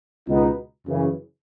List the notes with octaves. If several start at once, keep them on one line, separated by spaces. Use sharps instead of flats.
C#2 B2 G#3 B3 D#4
F#2 C#3 E3